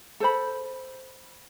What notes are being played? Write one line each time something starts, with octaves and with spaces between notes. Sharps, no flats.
A4 C5 B5